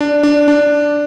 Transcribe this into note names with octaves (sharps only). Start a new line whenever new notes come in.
D4
D4
D4